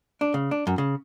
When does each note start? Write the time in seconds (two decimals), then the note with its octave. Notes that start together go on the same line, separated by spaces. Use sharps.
0.21 D4
0.34 C#3
0.51 D4
0.67 F#2
0.78 C#3